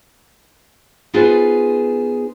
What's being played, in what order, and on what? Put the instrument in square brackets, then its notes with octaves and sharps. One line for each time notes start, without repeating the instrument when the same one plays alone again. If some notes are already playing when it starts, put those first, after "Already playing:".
[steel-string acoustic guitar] B3 D#4 F4 G#4 B4 C5